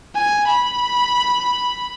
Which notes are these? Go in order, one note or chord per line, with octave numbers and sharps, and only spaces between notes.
G#5
B5